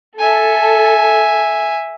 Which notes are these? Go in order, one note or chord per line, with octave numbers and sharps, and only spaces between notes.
A4 E5 G#5